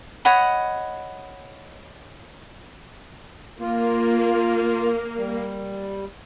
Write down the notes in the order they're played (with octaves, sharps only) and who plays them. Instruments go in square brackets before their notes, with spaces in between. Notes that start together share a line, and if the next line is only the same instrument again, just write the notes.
[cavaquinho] C#5 D#5 F#5 B5
[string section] A#3 [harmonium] F4
[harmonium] G3